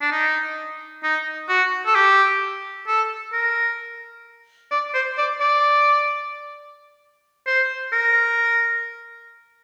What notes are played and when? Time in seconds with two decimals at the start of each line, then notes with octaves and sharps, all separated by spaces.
0.01 D4
0.12 D#4
1.03 D#4
1.49 F#4
1.86 A4
1.96 G4
2.88 A4
3.33 A#4
4.72 D5
4.94 C5
5.18 D5
5.41 D5
7.47 C5
7.93 A#4